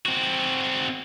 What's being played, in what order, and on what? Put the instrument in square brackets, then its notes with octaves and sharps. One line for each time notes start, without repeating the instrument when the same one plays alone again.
[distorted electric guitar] C4 F#4